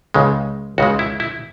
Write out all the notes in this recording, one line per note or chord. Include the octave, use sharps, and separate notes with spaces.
C#2 C#3 G#3
C#2 C#3 G#3 F#4
E4
E4